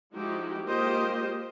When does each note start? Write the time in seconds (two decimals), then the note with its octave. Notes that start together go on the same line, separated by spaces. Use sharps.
0.15 F3 G#3 D#4 E4 F#4 G4
0.64 G#3 A#3 F4 G4 C5 D#5